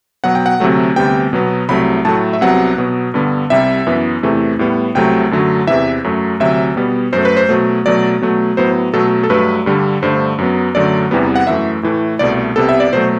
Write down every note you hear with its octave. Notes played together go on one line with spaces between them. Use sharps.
B2 F#3 B3 F#5
G5
F#5
D2 C3 F#3 A3
D2 C3 G3 B3 G5
B2 F#3 B3
C2 C3 F#3 A3 B5
A2 F#3 A3 A5
E5
C2 C3 F#3 B3 F#5
B2 F#3 B3
G2 D3 G3 B3
C2 C3 G3 E5
F#2 E3 B3
E2 C3 E3 A3
A2 G3 B3
C2 C3 F#3 A3 G5
F#2 D3 F#3 A3
E2 C3 E3 E5
F#2 F#3 A3
D2 C3 F#3 E5
B2 G3 B3
F#2 F#3 A3 C5
B4
C5
B2 F#3 A3
B2 F#3 A3 D5
B2 F#3 A3
A2 F#3 B3 C5
B2 F#3 A3 A4
A4
G2 F#3 A3 B4
G2 D3 G3
G2 D3 A3 C5
F#2 F#3 B3
F#2 D3 F#3 A3 D5
E2 C3 E3 G3 B3
F#5
F#2 E3 A3 E5
A2 E3 A3
C2 B2 A3 D5
C2 C3 G3 B3 A4
E5
D5
B2 F#3 A3 C5